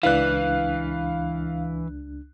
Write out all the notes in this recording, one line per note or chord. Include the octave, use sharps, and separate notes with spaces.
C#2 E3 D4 E4 B4 D5 F5 F#6